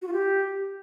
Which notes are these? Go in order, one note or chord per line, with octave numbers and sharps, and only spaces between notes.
F#4
F4
G4